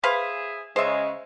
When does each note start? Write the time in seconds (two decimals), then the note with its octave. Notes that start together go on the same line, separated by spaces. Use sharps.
0.04 G#4 B4 C5 E5 F5
0.76 C#3 G#3 C5 E5